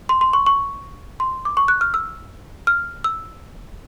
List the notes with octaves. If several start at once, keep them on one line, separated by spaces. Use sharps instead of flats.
C6
C6
C#6
C#6
C6
D6
C#6
F#6
F6
E6
F6
E6